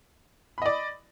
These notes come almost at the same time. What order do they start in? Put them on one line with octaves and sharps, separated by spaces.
B5 D#5 D5